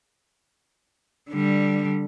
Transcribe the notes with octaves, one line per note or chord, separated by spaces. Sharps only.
D3 G3